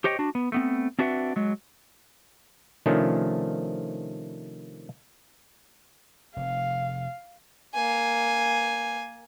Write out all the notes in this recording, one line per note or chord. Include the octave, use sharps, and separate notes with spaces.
G4 C5 C#5 D#5 G5
D4 F#4
B3
A3 B3 C4
C4 D4 F#4 B4 E5 F#5
F#3 G#3
C3 D#3 F3 A3 C#4 D4
F1 F5
A#3 G#5